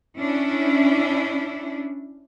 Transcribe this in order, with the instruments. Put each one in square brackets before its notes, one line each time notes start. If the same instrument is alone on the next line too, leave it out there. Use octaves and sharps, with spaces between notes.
[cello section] C#4 D4 E4